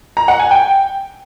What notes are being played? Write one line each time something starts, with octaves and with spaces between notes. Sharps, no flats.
A#5
F#5
G#5
G5